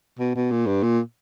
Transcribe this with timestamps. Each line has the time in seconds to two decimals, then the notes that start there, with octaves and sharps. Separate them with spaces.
0.19 B2
0.36 B2
0.51 A#2
0.67 G2
0.83 A#2